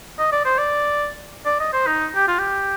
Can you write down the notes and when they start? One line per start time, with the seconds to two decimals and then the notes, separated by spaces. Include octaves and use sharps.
0.19 D#5
0.32 D5
0.45 C5
0.58 D5
1.46 D5
1.60 D#5
1.73 C5
1.87 D#4
2.16 G4
2.28 F4
2.39 G4